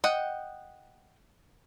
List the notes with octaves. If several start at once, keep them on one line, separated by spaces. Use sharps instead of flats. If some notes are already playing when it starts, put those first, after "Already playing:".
D#5 F#5 G5